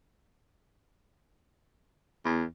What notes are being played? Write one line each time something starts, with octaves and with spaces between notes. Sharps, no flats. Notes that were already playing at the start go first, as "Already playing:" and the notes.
E2